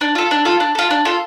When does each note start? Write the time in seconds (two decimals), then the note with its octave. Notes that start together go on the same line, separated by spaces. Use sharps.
0.01 D4
0.15 F4 A4
0.31 D4
0.45 F4 A4
0.60 D4
0.75 F4 A4
0.91 D4
1.05 F4 A4